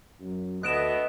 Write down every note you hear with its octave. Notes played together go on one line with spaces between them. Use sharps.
F#2
D2 A3 B3 D#5 F#6 D7 E7